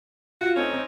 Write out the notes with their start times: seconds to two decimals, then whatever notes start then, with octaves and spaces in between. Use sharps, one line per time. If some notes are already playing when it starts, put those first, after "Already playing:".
0.41 F4 F#4
0.56 A3 C4 C#4 D#4
0.70 C4 D#4